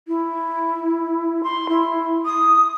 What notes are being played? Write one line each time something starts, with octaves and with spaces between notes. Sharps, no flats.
E4
C6
E4
D#6